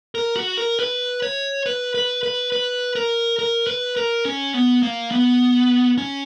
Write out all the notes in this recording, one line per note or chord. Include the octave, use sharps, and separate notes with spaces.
A#4
F#4
A#4
B4
C#5
B4
B4
B4
B4
A#4
A#4
B4
A#4
C#4
B3
A#3
B3
C#4